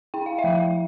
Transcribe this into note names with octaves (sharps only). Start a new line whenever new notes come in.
E4 G5
F5
E5 G5
F3